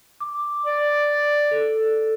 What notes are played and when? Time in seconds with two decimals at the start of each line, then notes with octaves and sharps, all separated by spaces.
0.20 D6
0.66 D5
1.51 A4